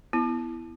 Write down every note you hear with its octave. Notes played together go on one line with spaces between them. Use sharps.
B3 E4